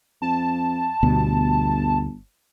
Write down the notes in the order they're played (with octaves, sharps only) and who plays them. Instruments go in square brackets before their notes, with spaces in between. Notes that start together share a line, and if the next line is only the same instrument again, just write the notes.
[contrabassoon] F2 [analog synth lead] A5
[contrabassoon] G1 [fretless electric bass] D2 B2